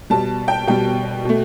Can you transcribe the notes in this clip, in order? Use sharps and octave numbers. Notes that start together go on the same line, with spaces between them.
B2 G3 A5
G5
B2 G3 G5
B2 A3